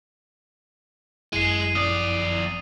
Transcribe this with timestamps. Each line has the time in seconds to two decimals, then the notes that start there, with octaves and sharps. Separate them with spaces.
1.33 G#1 F#2 G#3 E4 C7 D#7
1.75 F2 D5 D#6